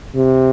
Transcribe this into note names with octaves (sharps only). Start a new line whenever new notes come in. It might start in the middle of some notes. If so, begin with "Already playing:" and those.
C3